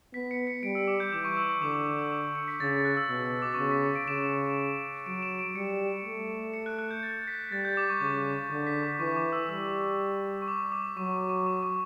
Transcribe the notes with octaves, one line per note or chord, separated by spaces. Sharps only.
B3 B6
C#7
C#7
G3 D7
E6
D6
G6
E3 D6
C#6
E6
C#6
D3 D6
D6
D6
E6
D6
E6
C#7
B6
C#3 A6
F#6
E6
B2
E6
D6
C#6
C#3 D6
B6
C#7
D7
C#3 E7
F#3 D7
E7
D7
G3 C#7
A3
C#7
F#6
F#6
G6
A6
B6
G3 A6
G6
D6
C#6
C#3 D6
D6
C#6
D3
B6
D6
E3 C#6
D6
E6
G3 E6
C#6
D6
D6
F#3 C#6
C#6
D6
C#6